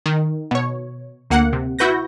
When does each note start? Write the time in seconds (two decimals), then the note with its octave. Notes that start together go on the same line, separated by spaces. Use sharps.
0.06 D#3
0.51 B2 C#5
1.30 D2 A#3 F#5
1.53 C3
1.79 E4 F#4 B4 G6 A#6